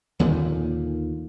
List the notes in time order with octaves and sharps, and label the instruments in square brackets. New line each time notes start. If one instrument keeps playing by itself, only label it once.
[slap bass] D#2 A#2 D3 D#3